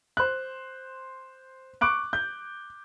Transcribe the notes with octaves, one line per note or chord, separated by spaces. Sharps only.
C5 F#6
C#6 D6 F#6 D7
G6